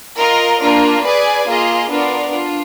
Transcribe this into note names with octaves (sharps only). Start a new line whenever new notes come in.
F4 A#4 D#5
A#3 D4 F4 A#4
G#4 B4 D5 G#5
A#3 F4 G#4 D#5
B3 D4 F4 A#4 D5
D4 F4